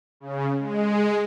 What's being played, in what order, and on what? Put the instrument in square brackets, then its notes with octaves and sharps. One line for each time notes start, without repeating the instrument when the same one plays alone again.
[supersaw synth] C#3
G#3